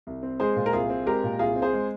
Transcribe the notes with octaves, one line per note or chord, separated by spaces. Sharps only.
C2
C4
G#3 G#4 C5
A#2
A#4
C2 F4 G#4
C4
G#3 G4 A#4
A#2
C2 F4 G#4
C4
G#4 C5
G#3